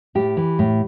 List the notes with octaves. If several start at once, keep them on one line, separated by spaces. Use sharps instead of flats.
A2 G4
E3
A2